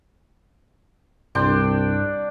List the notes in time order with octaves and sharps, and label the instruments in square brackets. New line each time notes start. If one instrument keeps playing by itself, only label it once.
[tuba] C2 [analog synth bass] G2 [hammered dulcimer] D4 G5 C6